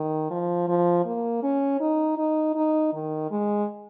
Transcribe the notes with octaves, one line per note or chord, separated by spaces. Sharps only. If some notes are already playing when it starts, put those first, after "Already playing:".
Already playing: D#3
F3
F3
A#3
C#4
D#4
D#4
D#4
D#3
G#3